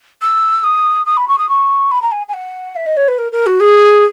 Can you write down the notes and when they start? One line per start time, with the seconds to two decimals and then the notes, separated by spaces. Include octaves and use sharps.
0.21 E6
0.63 D#6
1.06 D#6
1.17 B5
1.28 C#6
1.38 D#6
1.49 C#6
1.91 B5
2.02 A#5
2.12 G#5
2.28 G#5
2.33 F#5
2.76 E5
2.86 D#5
2.97 C#5
3.08 B4
3.18 A#4
3.32 A#4
3.46 F#4
3.60 G#4